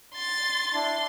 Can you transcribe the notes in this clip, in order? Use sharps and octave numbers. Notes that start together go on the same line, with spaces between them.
C6 A6
D4 E4 C6